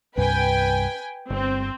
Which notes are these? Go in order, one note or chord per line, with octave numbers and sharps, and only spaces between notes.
C2 G2 B4 G5 G#5
G1 C4